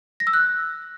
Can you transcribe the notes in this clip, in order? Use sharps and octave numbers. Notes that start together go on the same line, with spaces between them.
A#6
E6
F#6